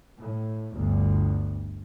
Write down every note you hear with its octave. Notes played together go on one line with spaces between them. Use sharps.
A2
G1 D2